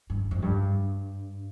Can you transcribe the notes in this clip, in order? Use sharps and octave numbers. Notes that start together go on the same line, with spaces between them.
G2
F2
G2